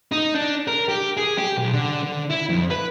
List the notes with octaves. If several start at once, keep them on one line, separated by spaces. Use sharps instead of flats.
D#4
D4
A#4
G4
G#4
G4
B1
D3
D3
E4
F2
B4